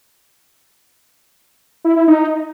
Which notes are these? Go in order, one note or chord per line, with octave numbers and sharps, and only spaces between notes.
E4
E4
D#4